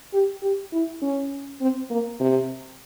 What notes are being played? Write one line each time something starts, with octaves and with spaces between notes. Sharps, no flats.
G4
G4
E4
C#4
C4
A#3
C3